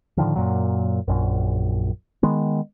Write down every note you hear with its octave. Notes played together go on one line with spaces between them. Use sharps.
A2 D3 D#3 F3
F#2 A#2 F#3
A#1 F#2
D#3 G#3 B3